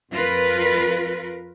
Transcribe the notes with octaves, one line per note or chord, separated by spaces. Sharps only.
F2 F4 A#4 B4